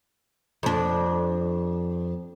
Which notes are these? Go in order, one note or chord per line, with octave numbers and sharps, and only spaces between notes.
F2 D4